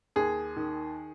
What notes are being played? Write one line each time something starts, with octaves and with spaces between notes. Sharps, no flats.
D#2 G#4
D#3